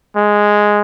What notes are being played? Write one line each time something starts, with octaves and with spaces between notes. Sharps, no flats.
G#3